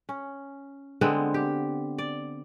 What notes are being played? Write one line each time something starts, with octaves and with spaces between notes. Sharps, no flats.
C#4
D3 G#3 B3 C4
G4
D5